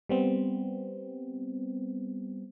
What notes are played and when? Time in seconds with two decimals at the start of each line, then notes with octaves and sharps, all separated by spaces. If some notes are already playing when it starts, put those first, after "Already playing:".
0.09 G3 B3 C4